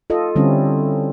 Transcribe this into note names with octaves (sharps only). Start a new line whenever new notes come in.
F4 A4 D#5
D3 G3 C4 C#4 E4